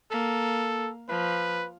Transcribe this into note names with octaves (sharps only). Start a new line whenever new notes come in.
A#3 A4
F3 B4